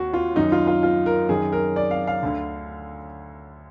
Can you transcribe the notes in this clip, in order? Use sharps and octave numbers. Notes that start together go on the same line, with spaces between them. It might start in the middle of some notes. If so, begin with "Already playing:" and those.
Already playing: D#2 F#4
F4
F#2 D#3 D#4
F4
F4
F4
A#4
F#2 D#3 G#4
A#4
D5
F5
F5
D2 D3